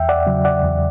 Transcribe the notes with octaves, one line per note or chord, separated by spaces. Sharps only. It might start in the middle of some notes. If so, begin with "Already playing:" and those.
Already playing: E2 E5 G5
D5 F#5
C#3 F#3
D5 F#5
E2